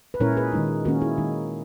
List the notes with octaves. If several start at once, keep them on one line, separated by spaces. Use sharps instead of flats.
B4
A#2 G#3 C#4 E4 A#4 C#5
G#4 B4
D#3 G#3 D#4
D#3 A#3 C#4 F#4 A#4
E4 G#4
D#3 G#3 D#4